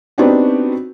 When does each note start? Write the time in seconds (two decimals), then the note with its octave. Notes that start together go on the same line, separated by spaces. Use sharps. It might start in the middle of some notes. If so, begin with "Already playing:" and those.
0.18 B3 C4 D4 D#4 F#4 G4